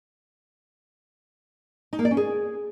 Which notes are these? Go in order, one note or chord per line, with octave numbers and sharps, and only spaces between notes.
D#4
A#3
D5
C#4
G#4